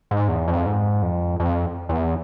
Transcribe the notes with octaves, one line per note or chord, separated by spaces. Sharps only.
G#2
E2
F2
G#2
F2
F2
E2